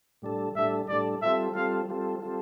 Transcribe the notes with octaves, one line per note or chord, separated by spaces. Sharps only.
A2 G3 D4 A4
A2 G3 D4 A4 E5
A2 G3 D4 A4 D5
G3 C4 F4 A4 E5
G3 C4 F4 A4 F5
G3 C4 F4 A4
G3 C4 F4 A4